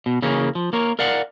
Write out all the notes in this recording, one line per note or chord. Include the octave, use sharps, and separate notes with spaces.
B2
C#3 E3 A#3 C#4
F3
A#3 A#4 C#5
A#4 D5 F5 F#5